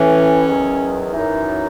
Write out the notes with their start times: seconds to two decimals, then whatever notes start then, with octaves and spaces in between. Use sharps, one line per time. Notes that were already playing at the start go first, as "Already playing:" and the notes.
Already playing: A2 E3 C#4
0.46 E2 D#3 F#3
1.12 F#2 E3 D#4